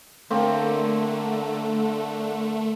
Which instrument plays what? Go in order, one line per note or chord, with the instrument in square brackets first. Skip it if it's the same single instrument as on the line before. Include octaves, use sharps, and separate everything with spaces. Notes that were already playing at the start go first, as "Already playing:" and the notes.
[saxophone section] D3 [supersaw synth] A3 [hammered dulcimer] A#3 C4 C#5